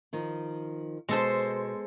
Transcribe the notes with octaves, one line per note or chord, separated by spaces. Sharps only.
D#3 F3
B2 G#3 A4 C5